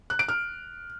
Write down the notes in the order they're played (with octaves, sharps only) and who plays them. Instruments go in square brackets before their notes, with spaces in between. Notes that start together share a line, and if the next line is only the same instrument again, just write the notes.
[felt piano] F#6
D7
F6